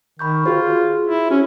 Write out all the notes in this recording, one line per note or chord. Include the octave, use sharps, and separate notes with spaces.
D#3 B5 C#6 G6
F4 F#4 G#4 C5
E4
C#4 F#4